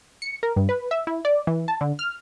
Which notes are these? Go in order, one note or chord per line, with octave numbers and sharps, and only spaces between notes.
C#7
A#4
G2
B4
E5
E4
D5
E3
A5
D3
F6